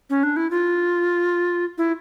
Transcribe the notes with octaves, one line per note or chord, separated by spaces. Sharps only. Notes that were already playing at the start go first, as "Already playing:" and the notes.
C#4
D4
E4
F4
E4